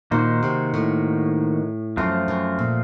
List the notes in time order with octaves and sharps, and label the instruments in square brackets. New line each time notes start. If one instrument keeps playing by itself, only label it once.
[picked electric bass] A#2 [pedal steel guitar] D#3 A#3 D#4 F#4 C5
[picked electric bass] C3
A2
[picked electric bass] F#2 [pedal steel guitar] F3 A3 C4 F4
[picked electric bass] F#2
A#2